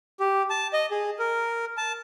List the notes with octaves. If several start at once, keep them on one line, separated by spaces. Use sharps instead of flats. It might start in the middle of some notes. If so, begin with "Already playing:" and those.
G4
A5
D#5
G#4
A#4
A5